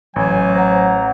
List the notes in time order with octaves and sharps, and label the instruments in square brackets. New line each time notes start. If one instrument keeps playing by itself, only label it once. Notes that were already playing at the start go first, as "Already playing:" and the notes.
[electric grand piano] A1 [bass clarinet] F#3 [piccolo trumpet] G#5
[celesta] C5 F#5 [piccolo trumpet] A#5